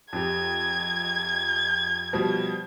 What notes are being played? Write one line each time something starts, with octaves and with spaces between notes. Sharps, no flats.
F2 G4 G#6
B2 F3 G3